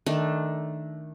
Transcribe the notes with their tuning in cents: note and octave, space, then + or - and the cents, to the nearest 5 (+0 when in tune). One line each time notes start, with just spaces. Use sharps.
D#3 +0 A3 -10 D4 +0